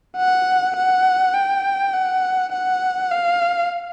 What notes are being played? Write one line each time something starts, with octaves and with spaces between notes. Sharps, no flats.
F#5
F#5
G5
F#5
F#5
F5